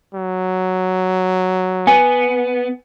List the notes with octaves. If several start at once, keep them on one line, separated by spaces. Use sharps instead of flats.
F#3
B3 G#5